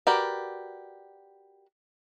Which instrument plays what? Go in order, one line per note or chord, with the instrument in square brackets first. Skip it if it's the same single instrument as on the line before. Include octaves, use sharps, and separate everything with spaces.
[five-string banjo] F#4 G4 A#4 B4 D5